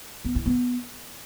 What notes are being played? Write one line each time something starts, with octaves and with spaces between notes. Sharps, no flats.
B3
E4
B3